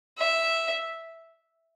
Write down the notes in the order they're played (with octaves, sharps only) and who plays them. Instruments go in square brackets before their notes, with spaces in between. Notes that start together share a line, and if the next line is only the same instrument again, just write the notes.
[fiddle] E5